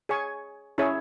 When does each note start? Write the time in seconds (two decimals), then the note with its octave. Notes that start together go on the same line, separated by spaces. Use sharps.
0.09 G#4 C#5 G#5 C#6
0.78 C#4 E4 G#4 C#5 E5